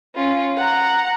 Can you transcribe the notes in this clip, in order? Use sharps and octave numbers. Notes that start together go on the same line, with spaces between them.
C#4 F4
F#5 A#5